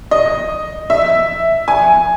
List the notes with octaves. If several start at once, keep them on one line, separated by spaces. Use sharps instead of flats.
D#5
E5
G#5